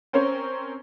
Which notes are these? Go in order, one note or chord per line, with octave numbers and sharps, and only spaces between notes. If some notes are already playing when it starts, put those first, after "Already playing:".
C4 C#4 A#4 C5 C#5